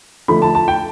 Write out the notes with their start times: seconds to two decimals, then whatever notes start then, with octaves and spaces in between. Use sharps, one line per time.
0.28 D3 F3 A3 B5
0.42 A5
0.55 A5
0.68 G5